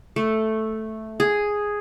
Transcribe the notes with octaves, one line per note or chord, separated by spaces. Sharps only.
A3
G#4